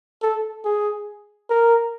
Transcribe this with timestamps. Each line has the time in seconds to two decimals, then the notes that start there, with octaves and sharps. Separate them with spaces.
0.23 A4
0.65 G#4
1.50 A#4